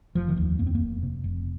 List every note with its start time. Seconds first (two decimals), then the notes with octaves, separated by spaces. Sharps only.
0.15 F1 F3
0.29 D#3
0.37 D#2 F3
0.59 F2 A#3
0.67 C4
0.75 A#3
0.81 F1
1.03 C3
1.24 F1